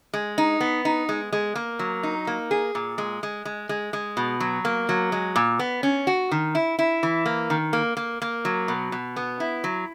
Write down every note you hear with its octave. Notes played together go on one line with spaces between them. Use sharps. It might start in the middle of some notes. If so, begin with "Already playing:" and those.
G#3
D#4
B3
D#4
G#3
G#3
A#3
F#3
D#4
A#3
G#4
A#2
G#3
G#3
G#3
G#3
G#3
B2
F#3
A#3
F#3
G#3
A#2
B3
C#4
F#4
D#3
E4
E4
E3
A#3
D#3
A#3
A#3
A#3
F#3
B2
B2
B3
E4
F#3